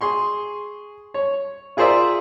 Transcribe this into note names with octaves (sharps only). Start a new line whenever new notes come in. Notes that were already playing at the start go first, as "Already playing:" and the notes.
G#4 C6 C#6
C#5
F4 G#4 A#4 C5 D5 E5